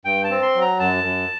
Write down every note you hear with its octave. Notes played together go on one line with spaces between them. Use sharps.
G2 G5
A5
C4
C6
F#3
A#5
F#2 A5
F#2